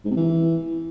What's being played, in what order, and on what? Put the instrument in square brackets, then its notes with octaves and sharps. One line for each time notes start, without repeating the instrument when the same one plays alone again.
[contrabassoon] G#2
C3
E3